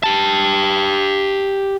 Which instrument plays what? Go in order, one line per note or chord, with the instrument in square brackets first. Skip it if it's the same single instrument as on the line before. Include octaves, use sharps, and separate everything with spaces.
[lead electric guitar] G4 A5